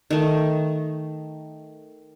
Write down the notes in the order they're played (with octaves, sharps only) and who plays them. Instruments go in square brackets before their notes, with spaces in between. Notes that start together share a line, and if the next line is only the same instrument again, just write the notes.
[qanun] D#3 A3